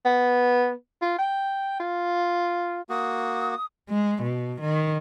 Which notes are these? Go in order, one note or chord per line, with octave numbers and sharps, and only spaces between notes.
B3
F4
G5
F4
A#3 F#4 D#6
G#3
B2
D#3